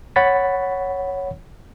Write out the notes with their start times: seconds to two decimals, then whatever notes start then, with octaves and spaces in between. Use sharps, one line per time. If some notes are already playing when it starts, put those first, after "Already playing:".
0.16 C#5 F#5 B5 A6 B6